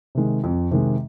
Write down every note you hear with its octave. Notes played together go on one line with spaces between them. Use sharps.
C3 D#3 G#3
F2
C3 D#3 G#3